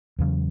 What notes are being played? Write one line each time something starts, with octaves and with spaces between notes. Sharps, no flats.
E2 C#3 F#3